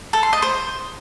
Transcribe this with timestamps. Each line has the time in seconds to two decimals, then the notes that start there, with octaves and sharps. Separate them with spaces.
0.13 A4
0.23 C6
0.33 D#5
0.42 C5